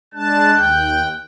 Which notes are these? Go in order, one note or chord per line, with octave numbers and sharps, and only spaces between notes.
G#3 D4 A5 F#6
D#2 G5